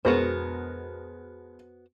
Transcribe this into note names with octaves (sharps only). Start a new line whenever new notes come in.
F2 B2 G#3 B3 D4 F#4 A#4 C5